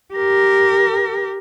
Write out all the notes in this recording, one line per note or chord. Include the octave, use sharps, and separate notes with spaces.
G4 A#4